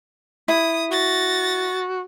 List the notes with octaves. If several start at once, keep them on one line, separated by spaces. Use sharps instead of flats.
E4 D#6
F#4 A6 A#6